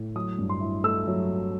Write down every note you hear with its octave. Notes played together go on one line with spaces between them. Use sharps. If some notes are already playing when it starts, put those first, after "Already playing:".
Already playing: A2
F#3 D#6
G2
C6
E4
A3 E6
F#3